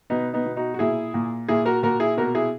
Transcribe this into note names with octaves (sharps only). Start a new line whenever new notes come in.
B2 B3 D#4
B3 D#4
B2
D#4 F#4
F#4
A#2 E4 G#4
A#2
A#2 E4 G#4
F#4 A#4
A#2 F#4 A#4
E4 G#4
B2 F#4 A#4
E4 G#4